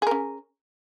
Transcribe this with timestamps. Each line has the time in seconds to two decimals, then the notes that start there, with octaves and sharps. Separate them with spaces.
0.02 G#4
0.07 A#4
0.11 C#4